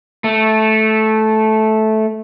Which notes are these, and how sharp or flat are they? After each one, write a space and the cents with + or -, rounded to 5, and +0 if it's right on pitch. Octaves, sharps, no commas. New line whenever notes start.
A3 -10